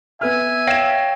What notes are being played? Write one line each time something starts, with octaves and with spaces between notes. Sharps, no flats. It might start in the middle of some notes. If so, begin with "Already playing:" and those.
B3 B4 E5 G#5 F6
C#5 F5 G5 A#6 E7